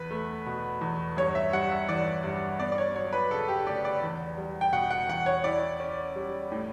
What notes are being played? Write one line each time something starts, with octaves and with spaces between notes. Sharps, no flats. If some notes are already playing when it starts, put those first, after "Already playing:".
Already playing: E2 B4
A3
B2
E2
G2 C#5
E5
G3 F#5
E5
E3 D5
G2
B3 D5
D5
C#5
F#3 C#5
B4
C#3 A4
G4
D2 D5
D5
E2
G3
G5
B2 F#5
F#5
E2 F#5
C#5
E4 D5
C#4
G3
A2